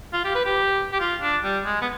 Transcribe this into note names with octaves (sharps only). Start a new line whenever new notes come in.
F4
G4
B4
G4
G4
F4
D4
G3
G#3
B3